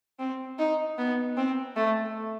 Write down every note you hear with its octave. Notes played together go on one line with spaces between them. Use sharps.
C4
D#4
B3
C4
A3